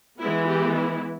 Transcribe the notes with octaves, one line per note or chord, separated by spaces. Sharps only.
E3 G#3 B3 E4
G4
E4